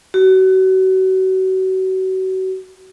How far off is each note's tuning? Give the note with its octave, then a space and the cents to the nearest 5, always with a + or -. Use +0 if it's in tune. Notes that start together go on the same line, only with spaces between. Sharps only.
F#4 +30